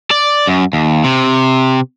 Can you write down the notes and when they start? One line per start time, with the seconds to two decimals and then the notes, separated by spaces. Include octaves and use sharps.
0.11 D5
0.47 F#2
0.73 D#2
1.04 C3